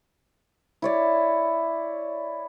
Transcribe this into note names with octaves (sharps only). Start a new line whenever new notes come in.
E4 C#5 D5